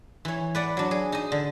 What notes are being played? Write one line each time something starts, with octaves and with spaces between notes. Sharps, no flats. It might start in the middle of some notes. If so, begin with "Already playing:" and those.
E3 C#5
B4 D5 F#5
F#3 D4
G#4
D#4 D#5
D3